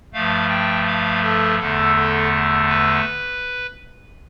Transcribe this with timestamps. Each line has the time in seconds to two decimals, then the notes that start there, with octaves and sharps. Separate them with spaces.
0.13 G2 F3 A3 F5
0.50 G5
0.86 F5
1.23 A4
1.59 E2 D3 A3 A4
1.96 A4
2.68 B4